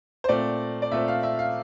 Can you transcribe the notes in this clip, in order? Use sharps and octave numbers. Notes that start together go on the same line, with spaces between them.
C5
A#2 A3 C4 D5
D5
A#2 A3 C4 E5
F5
E5
F5